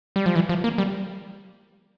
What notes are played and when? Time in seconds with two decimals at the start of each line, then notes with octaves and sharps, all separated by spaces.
0.16 G3
0.26 F3
0.35 E3
0.49 F3
0.64 A#3
0.78 G3